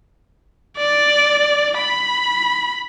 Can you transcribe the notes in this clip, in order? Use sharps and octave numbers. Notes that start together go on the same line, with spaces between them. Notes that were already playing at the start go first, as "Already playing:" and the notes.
D5
B5